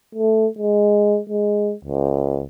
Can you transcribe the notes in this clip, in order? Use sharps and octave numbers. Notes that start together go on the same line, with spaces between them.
A3
G#3
G#3
C#2